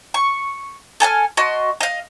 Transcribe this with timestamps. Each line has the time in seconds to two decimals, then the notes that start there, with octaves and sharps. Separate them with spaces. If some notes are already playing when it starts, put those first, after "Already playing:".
0.14 C#6
1.00 A4 G#5 A5 F6
1.37 F#4 D#5 A5 C6
1.81 D#5 F5